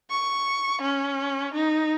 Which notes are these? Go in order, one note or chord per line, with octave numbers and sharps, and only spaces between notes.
C#6
C#4
D#4